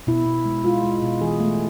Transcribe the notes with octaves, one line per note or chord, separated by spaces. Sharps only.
B2 E4
B2
G#3
G#3 F4
G#3
B2
E3 G#4
A3